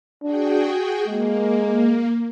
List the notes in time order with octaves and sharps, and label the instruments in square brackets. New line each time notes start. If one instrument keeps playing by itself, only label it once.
[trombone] D4 [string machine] F#4 G#4 G5
[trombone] G#3 [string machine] A#3